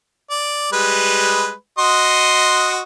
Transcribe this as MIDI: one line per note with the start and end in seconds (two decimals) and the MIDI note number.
0.30 0.68 74
0.72 1.52 55
0.72 1.52 56
0.72 1.52 71
1.78 2.82 66
1.78 2.82 75
1.78 2.82 84